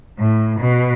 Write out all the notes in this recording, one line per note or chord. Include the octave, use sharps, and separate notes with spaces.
A2
B2